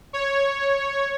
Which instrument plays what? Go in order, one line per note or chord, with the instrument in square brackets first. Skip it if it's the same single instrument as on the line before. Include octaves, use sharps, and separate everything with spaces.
[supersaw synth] C#5